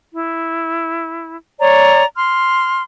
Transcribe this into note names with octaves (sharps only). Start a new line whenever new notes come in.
E4
C#5 D5 A#5
C6 F6